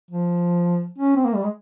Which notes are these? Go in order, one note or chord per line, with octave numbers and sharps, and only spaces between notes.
F3
C#4
C4
A#3
G3
G#3